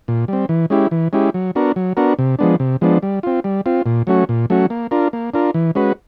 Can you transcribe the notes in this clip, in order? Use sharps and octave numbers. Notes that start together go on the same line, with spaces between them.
A#2
G3 C4
E3
G#3 C#4 E4 G4
E3
G#3 C#4 E4 G4
F#3
B3 D4 F#4 A#4
F#3
B3 D4 F#4 A#4
C3
F3 G#3 B3 D4
C3
F3 G#3 B3 D4
G3
C4 F4
G3
C4 F4
A#2
F#3 A3 C#4 F#4
A#2
F#3 A3 C#4 F#4
A#3
D4 F4 A#4
A#3
D4 F4 A#4
E3
G#3 C#4 F#4 B4